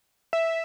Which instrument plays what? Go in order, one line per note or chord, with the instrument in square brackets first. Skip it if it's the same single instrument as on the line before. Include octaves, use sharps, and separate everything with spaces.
[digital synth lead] E5